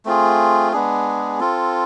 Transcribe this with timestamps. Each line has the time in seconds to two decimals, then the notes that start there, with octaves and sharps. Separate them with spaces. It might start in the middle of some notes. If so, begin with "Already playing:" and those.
0.05 A3 C4 F4 G#4
0.72 G#3 B3 D4 G#4
1.40 C4 F4 A4